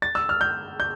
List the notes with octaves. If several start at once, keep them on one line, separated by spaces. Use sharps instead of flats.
A6
E6
F6
G6
G6